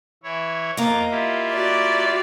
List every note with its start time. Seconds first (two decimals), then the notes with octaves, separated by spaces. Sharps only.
0.23 E3 E4 C#5
0.77 F2 A#3 D#5 A#5 D6
1.11 E4 F4 G4
1.51 F#4 D5